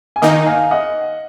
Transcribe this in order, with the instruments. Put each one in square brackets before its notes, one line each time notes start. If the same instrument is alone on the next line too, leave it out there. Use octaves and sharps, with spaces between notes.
[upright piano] G#5
[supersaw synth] D#3 A#3 D#4 [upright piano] D#5 F#5
[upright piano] F5 G#5
D#5 F#5